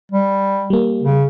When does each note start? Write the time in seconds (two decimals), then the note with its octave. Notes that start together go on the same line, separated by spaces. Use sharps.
0.12 G3
0.70 G3 A#3
1.03 C#3